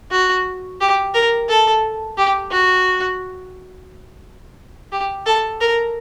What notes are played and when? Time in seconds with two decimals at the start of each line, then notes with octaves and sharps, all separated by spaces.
0.11 F#4
0.81 G4
1.14 A#4
1.49 A4
2.18 G4
2.51 F#4
4.92 G4
5.26 A4
5.60 A#4